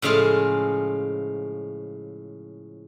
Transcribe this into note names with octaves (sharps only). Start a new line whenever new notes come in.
A2 C#3 F3 G#3 F4